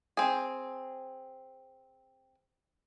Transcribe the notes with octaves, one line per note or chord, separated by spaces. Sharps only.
C4 G#4